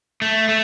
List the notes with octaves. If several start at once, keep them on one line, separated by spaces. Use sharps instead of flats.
A3
A3